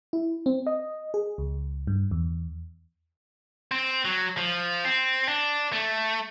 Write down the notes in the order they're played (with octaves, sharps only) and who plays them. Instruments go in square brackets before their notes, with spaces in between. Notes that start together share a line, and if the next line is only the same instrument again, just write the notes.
[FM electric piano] E4
C4
D#5
G#4
C#2
G2
E2
[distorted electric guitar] C4
F#3
F3
C4
D4
A3